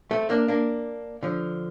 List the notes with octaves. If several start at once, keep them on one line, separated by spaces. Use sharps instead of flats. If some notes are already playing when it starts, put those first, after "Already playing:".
A3 C4
A#3 D4
A#3 D4
D3 F3